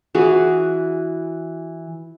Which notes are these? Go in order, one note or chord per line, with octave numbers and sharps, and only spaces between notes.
E3 F#4 G#4